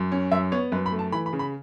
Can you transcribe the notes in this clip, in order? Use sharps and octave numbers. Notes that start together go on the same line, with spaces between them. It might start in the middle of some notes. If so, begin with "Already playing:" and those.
Already playing: F#2
C#4
F#2 E5
B3 C#5
F#2 B4
B5
A3
A5
E3 B5
B5
C#3
B5